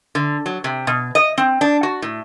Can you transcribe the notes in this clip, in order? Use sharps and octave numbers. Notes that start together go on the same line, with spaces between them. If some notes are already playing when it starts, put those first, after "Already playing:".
D3
F#3
C3
B2
D#5
C4
D4
F#4
A2